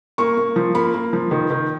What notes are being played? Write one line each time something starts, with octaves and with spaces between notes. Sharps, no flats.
A#3 C#6
A#3
F3
A#3 B5
A#3
F3
D#3
D#3